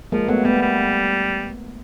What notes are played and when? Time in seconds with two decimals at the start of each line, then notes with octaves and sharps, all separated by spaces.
0.12 F3 G#3 A#3
0.28 F#3 A3 B3
0.45 G3 A3 B3
0.62 G3